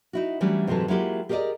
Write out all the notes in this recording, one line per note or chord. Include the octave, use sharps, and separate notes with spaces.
D#4 E4 F#4
E3 F#3 G3 A3 C#4 D4
G#2 C3 E3 F#3 G#3 A4
F#3 G#3 A#3 E4 F4 G4
G4 G#4 A#4 C5 D5 D#5